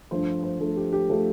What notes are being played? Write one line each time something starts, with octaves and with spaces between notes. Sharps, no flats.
G2 F3 A3 C5
C5
G2 F3 A3 A4
G4
G4
F3 A3 A4